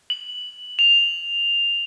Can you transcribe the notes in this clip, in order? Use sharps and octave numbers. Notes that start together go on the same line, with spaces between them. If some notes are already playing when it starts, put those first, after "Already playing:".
F#7
F7